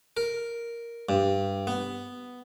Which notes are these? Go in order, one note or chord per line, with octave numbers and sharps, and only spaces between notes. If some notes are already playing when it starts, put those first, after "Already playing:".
A#4
G2
B3